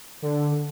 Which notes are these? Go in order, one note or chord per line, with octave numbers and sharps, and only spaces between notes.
D3